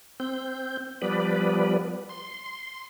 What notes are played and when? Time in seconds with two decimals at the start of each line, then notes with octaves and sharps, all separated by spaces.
0.20 C4 G6
1.02 F3 G3 B3 B4 D5
2.09 C6